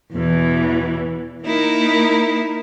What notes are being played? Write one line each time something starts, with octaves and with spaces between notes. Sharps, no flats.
E2 B2 E3
A#3 D#4 E4 A#4